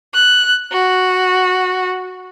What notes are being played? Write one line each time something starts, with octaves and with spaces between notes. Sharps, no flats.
F#6
F#4